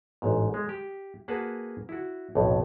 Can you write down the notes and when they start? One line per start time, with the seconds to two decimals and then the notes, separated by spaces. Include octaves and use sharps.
0.22 A1 G#2
0.54 G#3
0.69 G4
1.28 A#3 F#4 G#4 B4 F#5 A5
1.89 E4 F#4
2.35 B1 F2 A2